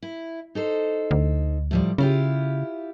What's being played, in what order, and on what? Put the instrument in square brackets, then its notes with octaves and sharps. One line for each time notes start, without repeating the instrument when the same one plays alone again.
[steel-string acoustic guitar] E4
D#4 A4 C5
[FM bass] D2
[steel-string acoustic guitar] A2 F3 G3
[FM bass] C#3 [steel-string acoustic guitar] E4 F4 G4